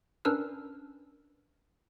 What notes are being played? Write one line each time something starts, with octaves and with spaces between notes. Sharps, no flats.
C#4 D4 A#4 B4 E6 F6